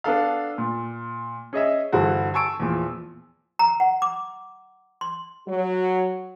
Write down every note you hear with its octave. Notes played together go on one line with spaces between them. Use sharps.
B3 D4 A4 F5
A#2
C#4 G#4 D#5 E5
G2 D3 E3 B3 F#4 C5
G#5 A5 C#6 E6 D7
E2 A#2 F3
A#5
F#5
D6
C6
F#3 F#4